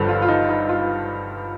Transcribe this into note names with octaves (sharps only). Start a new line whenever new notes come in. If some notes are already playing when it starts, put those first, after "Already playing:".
Already playing: G1 G2 D3 F3 A4
F4
F4
D#4
D#4
F4